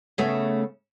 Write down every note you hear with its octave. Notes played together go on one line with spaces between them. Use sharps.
C#3 A3 B3